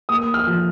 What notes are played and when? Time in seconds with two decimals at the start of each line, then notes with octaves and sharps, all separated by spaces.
0.09 A#3 D#6
0.34 F6
0.47 F3